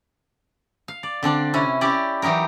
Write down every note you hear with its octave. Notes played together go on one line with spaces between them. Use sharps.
F5
D5
D3 C4 D4 D5
C3 C#4 E4
C#4 E4 G4 D5
E3 F#3 D#4 G4 A#4